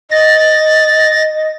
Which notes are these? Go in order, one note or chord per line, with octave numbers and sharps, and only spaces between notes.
D#5 A6 A#6